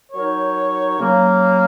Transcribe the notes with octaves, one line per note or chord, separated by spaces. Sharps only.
F#3 D#4 A#4 C#5
C#3 F#3 A#3